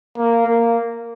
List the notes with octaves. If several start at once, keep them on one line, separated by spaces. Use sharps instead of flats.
A#3
A#3